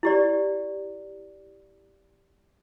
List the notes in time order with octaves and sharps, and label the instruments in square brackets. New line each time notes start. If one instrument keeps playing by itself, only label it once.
[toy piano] E4 G4 D5